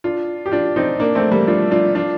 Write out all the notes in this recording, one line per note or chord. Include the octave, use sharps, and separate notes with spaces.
D4 F4
G4
D4 F4
C4 D#4
A#3 D4
A3 C4
G3 A#3
D4 F4
D4 F4
D4 F4